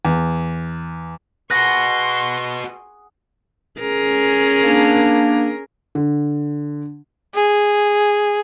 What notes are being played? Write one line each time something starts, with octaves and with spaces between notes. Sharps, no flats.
E2
F#4 G#4 B4 F#5 C6 C#6 F#6 A#6
C#4 G#4 A#4
A#3 D4
D3
G#4